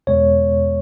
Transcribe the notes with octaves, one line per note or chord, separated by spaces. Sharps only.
E2 B2 G#3 B3 C#5